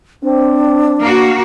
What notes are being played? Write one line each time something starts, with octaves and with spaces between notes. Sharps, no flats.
C4 D4
A#3 F#4